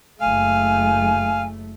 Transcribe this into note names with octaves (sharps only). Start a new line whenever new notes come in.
F#1 A3 F5 G#5